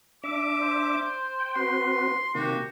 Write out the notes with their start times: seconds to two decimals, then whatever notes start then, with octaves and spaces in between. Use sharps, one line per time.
0.24 D4 E5 D6
0.61 C5
1.39 G5
1.56 C4 F#4 B4 C6
2.35 C3 D#3 A#3 F#4 G4